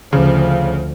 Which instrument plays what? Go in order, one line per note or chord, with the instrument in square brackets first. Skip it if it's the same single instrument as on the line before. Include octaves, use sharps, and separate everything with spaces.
[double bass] D2 F3 [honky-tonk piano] C#3